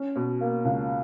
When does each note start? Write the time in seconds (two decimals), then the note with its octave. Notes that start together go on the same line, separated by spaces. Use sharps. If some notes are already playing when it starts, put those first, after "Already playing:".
Already playing: C#4
0.16 B2
0.41 A#3
0.65 C#2